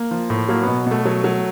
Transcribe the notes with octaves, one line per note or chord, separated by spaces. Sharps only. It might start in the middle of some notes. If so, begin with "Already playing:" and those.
Already playing: A#3
F3
A2
F#3 A#3
B2 B3
B2 A3
F#3
F#3